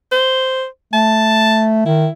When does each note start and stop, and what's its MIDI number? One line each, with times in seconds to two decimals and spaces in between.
0.12 0.66 72
0.93 1.84 57
0.93 1.67 81
1.86 2.08 51
1.86 2.11 64